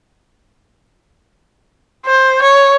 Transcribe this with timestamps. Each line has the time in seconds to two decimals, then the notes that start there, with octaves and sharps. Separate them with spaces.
2.06 C5
2.42 C#5